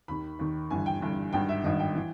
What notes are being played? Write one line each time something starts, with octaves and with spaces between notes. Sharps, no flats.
D#2 D#3 B5
D#2 D#3
G1 G2 E3 G#5
G5
G1 G2 E3
G#1 G2 D#3 G5
E5
G#1 G2 D#3 D#5
G5
E3